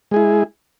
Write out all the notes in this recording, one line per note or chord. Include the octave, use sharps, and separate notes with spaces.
G#3 E4 G#4